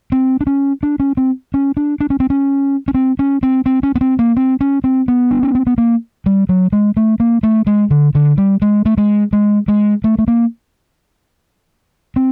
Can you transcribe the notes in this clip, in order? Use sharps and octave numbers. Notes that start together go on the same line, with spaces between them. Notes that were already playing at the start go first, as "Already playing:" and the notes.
C4
D4
C#4
D4
C#4
C4
C#4
D4
D4
C#4
C4
C#4
C#4
C4
C#4
C4
C4
C#4
B3
C4
A#3
C4
C#4
C4
B3
D4
C#4
C4
B3
A#3
G3
F#3
G#3
A3
A#3
A3
G#3
D3
D3
G3
G#3
A3
G#3
G#3
G#3
A3
A3
A#3
C4